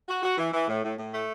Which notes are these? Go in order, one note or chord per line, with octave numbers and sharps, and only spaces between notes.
F#4
F#4
E3
E3
A2
A2
A2
A3